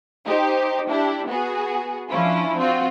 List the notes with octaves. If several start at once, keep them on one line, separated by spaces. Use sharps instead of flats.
D#4 G4 C5
D4 E4 G4
B3 F#4 G#4
F3 C#4 D4 E4 F4
C4 F4 F#4